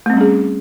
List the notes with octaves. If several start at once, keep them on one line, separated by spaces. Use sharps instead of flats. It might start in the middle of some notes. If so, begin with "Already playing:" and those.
G3 A3 C4 C#4 G#4